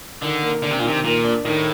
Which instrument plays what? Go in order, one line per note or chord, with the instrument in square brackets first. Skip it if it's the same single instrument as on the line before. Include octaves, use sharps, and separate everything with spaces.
[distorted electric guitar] D3 [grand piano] D#3
[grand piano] A#3
[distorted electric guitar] D3 [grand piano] D4
[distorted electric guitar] C3
A#2
[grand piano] D#3
[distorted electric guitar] C3
[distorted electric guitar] A#2 [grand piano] A#3
[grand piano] D4
[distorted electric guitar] A2 [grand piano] D#3